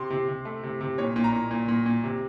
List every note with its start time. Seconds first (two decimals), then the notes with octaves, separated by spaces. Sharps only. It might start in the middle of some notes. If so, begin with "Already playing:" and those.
Already playing: C3 C6
0.10 C3
0.28 C3
0.45 A3
0.63 C3
0.81 C3
0.98 A#2 C#5
1.16 A#2
1.24 A#5
1.33 A#2
1.51 A#2
1.68 A#2
1.86 A#2
2.04 C3